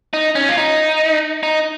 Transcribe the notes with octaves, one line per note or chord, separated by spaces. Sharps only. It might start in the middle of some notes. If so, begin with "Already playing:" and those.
D#4
C#4
F4
D#4
D#4